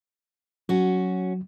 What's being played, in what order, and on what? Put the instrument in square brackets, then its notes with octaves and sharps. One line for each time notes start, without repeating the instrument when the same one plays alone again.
[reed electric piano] F#3 [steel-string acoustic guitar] C#4 F#4